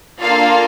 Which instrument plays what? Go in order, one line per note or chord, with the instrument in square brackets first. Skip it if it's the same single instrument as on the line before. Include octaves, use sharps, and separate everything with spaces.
[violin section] A#3 D4 F4 A4 F5